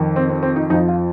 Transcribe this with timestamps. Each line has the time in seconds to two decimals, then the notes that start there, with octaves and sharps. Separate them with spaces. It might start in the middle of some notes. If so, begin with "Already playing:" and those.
Already playing: F2 D#3
0.16 C4
0.29 C4
0.43 C4
0.56 D#4
0.70 F2 D#4
0.74 F3
0.88 F4